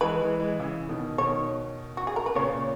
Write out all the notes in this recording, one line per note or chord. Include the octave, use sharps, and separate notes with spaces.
E3 G#3 B4
E3 G#3
E3 G#3
C#3 E3
B2 D#3
B2 D#3 C#5
F#4
G#4
A#4
B4
A#2 C#3 C#5